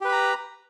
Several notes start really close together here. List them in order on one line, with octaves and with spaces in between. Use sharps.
G4 B4 B5 A#5